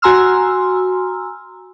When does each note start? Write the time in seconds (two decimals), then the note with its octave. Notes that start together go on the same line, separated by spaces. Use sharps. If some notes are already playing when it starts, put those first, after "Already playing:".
0.02 F#4 G#5 A#5 C6 E6 F6